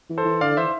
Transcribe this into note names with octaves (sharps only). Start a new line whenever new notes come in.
E3
A4 C5
E3
D3 D5 F5
E3 C5 E5